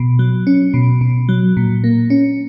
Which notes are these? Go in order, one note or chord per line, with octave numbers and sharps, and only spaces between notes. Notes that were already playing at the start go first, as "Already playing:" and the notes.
Already playing: B2
F#3
C#4
B2
B2
F#3
A#2
A#3
C#4